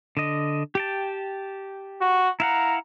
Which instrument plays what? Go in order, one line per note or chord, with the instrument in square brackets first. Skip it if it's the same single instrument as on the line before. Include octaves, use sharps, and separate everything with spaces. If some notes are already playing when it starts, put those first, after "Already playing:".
[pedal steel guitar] D3 D#5
G4 G5 A5
[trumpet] F#4
[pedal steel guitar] E4 F5 F#5 [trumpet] A#5